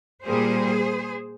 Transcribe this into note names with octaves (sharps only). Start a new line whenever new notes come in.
A#2 G3 A#3 G#4 C5